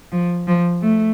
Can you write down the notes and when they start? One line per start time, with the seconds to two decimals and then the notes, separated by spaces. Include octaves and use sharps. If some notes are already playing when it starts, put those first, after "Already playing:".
0.12 F3
0.48 F3
0.82 A3